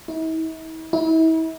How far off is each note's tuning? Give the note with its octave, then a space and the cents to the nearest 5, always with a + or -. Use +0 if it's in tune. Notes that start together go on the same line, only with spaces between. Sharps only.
E4 -45
E4 -35